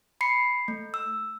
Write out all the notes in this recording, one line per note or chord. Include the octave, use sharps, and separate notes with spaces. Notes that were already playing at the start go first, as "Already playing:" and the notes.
B5 C7 C#7
A3
E6